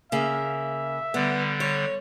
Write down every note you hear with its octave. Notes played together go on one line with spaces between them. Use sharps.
C#3 A#3 E5
D3 G3 B3
C#5